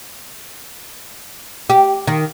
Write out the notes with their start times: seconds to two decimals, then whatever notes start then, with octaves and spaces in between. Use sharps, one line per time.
1.70 G4
2.07 D#3